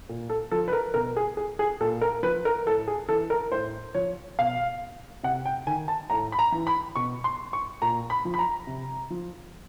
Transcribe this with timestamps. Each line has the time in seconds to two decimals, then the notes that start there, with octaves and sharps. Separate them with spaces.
0.09 A#2
0.30 A4
0.52 F3 A4
0.68 B4
0.73 A#4
0.94 B2 A#4
1.17 G#4
1.37 G#4
1.59 G#4
1.81 A#2 A4
2.01 A#4
2.23 F3 B4
2.45 A#4
2.66 A2 A4
2.88 G#4
3.09 E3 A4
3.30 A#4
3.52 A2 C5
3.95 F3 C#5
4.39 B2 F5
5.23 C3 F#5
5.45 G5
5.67 D#3 G#5
5.88 A5
6.10 A2 A#5
6.32 B5
6.39 A#5
6.52 E3
6.67 B5
6.96 B2 C#6
7.24 C6
7.53 C#6
7.82 A#2 A#5
8.10 B5
8.25 F3
8.34 B5
8.39 A#5
8.67 C3
9.10 F3